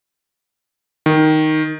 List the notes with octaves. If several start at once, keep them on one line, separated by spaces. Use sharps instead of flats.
D#3